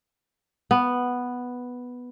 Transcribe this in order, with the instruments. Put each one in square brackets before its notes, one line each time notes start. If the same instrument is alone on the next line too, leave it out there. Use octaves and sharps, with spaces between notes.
[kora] B3